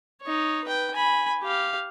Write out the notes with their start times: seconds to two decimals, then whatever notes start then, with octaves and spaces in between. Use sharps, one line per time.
0.22 D#4 C#5
0.64 B4 G5
0.95 G#5 B5
1.42 G4 F5